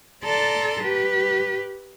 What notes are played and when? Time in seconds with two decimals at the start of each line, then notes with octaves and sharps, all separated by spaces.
0.22 A4 D5 A5 A#5 C6
0.83 G4 B4